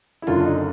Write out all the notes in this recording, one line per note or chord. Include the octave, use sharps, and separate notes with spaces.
E4
F#1 F#2 D3 F#3 F4
D4
D#4